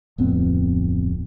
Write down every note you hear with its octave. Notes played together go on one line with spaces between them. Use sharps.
D1 F2 B3 C4